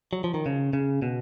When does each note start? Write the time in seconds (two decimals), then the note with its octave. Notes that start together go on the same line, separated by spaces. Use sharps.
0.13 F#3
0.24 F3
0.34 D#3
0.46 C#3
0.73 C#3
1.02 B2